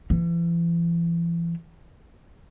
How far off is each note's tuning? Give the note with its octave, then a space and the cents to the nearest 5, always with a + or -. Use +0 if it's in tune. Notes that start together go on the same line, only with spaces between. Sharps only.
E3 +40